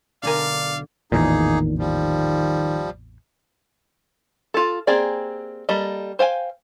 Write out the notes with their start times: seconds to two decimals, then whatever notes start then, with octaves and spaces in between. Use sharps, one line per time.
0.23 B1 D3 D4 A#4 D5 F5 G#5
1.12 A1 E2 A#2 D#3 A#3 D#4 G#4
1.78 D#3 F3 G3
4.54 F4 A4
4.87 A#3 C4 G4 G#4 D5
5.69 G3 A#3 A4 D#5
6.19 C5 F5 G5 G#5